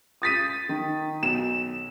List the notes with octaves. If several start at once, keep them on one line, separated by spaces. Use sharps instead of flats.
D#6 A6 B6 D#7
D#3
B1 E7